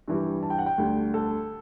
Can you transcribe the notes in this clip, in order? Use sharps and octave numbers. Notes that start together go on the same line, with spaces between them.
G2 E3 G3
A5
G5
F#5
G5
D2 D3 G3
A4